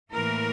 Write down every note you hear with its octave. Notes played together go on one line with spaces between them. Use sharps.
A2 E3 A#3 A#4